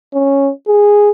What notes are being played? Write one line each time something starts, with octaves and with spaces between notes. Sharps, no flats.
C#4
G#4